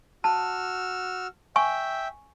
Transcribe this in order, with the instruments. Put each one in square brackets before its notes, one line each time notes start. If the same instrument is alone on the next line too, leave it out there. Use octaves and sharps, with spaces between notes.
[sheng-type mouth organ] F#4 E6 F6 [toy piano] A5
[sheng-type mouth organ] E5 G5 [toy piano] G#5 C#6